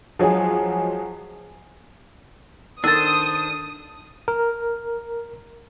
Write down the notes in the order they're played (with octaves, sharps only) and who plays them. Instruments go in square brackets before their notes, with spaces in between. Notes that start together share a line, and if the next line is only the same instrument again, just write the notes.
[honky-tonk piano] F3 F#3 G#3 G#4
[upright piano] D#3 A4 [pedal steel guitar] D4 C5 [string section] D#6 [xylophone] E6 A6
[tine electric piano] A#4